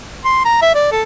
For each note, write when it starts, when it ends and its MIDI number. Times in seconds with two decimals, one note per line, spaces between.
0.25 0.43 84
0.45 0.60 82
0.62 0.73 76
0.75 0.88 74
0.92 1.03 69